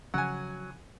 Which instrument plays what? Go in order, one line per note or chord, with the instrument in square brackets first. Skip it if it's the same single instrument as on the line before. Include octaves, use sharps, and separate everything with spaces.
[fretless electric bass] C#3 F3 C#4 [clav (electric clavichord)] F#3 [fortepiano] F#5 G#5